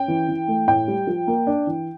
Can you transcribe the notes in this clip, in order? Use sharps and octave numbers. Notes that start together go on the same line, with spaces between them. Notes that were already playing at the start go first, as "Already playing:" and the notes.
Already playing: C#4 G5
E3
E3
A3
A2 G5
G3
F3
A#3
D4
E3